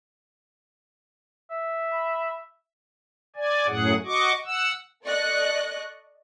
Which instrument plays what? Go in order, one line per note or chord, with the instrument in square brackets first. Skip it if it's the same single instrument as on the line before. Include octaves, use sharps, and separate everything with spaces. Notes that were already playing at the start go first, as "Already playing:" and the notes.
[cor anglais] E5
[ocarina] B5
[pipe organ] D5 G#5
F#2 A2 F#3 G#4 F#5
F#4 D#5 C#6 D6
F#5 E6
[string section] A4 D5 D#5 C#6 F#6